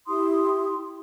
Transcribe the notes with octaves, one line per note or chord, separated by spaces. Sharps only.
E4 G4 C6 D#6